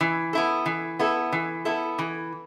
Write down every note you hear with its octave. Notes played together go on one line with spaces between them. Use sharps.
E3
B3 E4 A4
E3
B3 E4 A4
E3
B3 E4 A4
E3